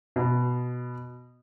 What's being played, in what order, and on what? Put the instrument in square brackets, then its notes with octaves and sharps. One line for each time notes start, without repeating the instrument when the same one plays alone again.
[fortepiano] B2